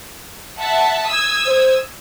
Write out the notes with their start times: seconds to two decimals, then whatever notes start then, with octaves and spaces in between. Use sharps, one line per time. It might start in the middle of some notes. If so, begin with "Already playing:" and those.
0.59 E5 F#5 A5
1.08 D#6 E6 G#6
1.47 C5